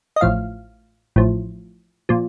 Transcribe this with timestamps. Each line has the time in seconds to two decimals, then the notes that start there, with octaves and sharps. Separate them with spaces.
0.16 D#5
0.21 A1 A2 F3 F5
1.16 A1 A2 F3
2.09 A#2 F3